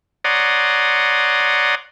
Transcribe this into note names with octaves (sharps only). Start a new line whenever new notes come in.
C#5 D5 F#5 A#5 C6 D#6